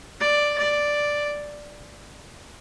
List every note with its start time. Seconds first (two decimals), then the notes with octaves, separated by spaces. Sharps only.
0.20 D5
0.58 D5